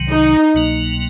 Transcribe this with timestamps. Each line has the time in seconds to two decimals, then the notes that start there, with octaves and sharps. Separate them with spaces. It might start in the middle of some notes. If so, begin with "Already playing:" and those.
Already playing: C2 C3 D#3 F#3
0.10 D#4
0.54 C2 B2 F#3 A#3